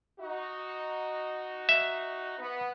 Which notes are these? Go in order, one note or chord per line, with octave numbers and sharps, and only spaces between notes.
D#4 F#4
E5
B3